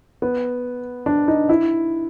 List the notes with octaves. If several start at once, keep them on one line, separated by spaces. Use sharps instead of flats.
B3
D4
D#4
E4